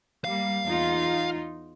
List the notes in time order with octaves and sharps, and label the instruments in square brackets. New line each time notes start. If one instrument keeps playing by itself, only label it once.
[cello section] G3 A#3 [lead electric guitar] F5
[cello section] E2 D#4 F4